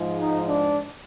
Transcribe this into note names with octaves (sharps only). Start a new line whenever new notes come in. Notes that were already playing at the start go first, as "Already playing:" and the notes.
Already playing: G#2 F3 G#3
D#4
D4